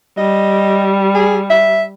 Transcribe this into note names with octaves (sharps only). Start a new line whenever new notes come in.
G3 D#5
G#4
E5